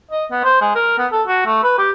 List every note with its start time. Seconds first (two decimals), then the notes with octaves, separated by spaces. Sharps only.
0.11 D#5
0.31 B3
0.44 C5
0.61 G#3
0.75 A#4
0.98 B3
1.12 A4
1.27 F#4
1.45 A3
1.63 B4
1.78 G4